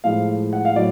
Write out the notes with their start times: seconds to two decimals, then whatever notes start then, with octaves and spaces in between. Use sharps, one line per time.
0.04 A2 F3 G#3 F5
0.53 F#5
0.65 F5
0.75 A2 F#3 D5